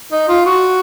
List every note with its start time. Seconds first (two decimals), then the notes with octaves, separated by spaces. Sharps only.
0.12 D#4
0.28 F4
0.45 F#4